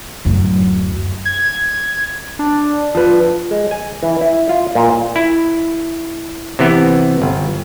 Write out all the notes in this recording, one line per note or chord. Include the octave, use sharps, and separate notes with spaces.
D1 F#2
G#6
D4
F3 B4
G#3
G#5
E3
E4
F4
A#2
E4
C3 E3 B3
G1